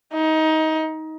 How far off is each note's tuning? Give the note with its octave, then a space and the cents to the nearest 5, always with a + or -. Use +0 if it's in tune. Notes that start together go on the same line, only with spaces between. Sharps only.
D#4 +20